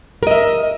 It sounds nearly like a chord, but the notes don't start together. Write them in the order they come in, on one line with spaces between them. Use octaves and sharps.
A#4 D#5 E5